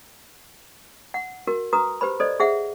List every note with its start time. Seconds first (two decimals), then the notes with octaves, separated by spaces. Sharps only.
1.14 F#5
1.47 F#4 A#4
1.73 F#4 B4 A#5 D#6
2.01 G4 B4 C5 B5
2.20 A4 C5 D5 D#5
2.40 G#4 C5 E5 F#5